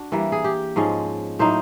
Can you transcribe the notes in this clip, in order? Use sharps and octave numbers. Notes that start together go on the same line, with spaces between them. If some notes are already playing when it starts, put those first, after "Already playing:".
Already playing: D4 F#4
E3 G3 A#3
G#4
G4
G#2 F3 G#3 C#4
A2 F#3 A#3 D#4 C5